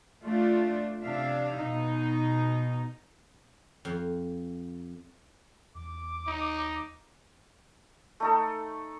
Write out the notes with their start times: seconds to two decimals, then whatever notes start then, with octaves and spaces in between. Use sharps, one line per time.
0.24 A3 D4 F4
1.03 C3 D4 E5 F5
1.58 B2 D#4
3.85 F2
5.75 E2 D6
6.27 D#2 D#4
8.20 A3 D#4 A4